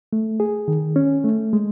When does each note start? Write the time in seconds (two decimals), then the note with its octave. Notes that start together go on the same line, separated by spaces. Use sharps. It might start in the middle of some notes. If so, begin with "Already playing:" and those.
0.13 A3
0.40 G#4
0.68 D#3
0.96 C#4
1.24 A3
1.53 G#3